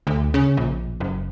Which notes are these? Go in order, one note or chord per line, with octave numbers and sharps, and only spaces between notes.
D2
C#3
A#1
F#1